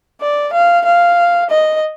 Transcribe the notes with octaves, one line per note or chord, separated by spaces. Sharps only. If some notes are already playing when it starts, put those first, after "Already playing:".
D5
F5
F5
D#5